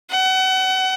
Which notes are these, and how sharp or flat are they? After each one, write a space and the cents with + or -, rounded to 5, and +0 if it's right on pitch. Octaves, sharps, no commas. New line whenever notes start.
F#5 +30